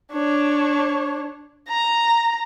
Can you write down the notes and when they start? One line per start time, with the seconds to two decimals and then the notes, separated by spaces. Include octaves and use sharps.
0.12 D4 C#5
1.69 A#5